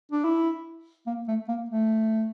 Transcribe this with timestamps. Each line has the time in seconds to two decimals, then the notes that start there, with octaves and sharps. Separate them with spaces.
0.12 D4
0.24 E4
1.07 A#3
1.28 A3
1.48 A#3
1.70 A3